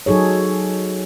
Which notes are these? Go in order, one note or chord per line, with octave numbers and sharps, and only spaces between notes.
F#3 D#4 G#4 A4 C#5